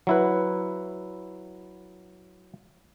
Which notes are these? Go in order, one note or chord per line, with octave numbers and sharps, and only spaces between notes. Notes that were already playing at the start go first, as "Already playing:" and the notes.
F#3 E4 B4